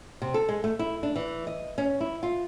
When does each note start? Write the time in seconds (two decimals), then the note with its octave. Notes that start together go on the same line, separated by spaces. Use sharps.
0.22 C3
0.34 A4
0.49 G#3
0.64 A3
0.79 E4
1.03 D4
1.16 E3
1.47 D#5
1.78 C#4
2.01 E4
2.23 F4